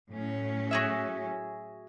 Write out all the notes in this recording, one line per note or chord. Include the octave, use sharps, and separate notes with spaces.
A2 F#3 C#4
F#4 G#4 E5